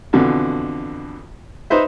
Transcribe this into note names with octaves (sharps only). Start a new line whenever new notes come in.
F2 B2 D3 E3
D#4 B4 C5 E5